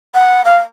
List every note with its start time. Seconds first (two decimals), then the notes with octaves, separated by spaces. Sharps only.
0.14 F#5
0.44 F5